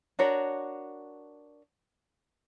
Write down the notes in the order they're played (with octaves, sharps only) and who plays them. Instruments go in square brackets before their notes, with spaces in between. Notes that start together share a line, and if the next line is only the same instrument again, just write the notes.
[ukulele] D4 F#4 A#4 C#5